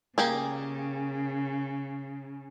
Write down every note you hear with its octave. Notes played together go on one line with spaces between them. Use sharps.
C#3 A#3 G4 G#4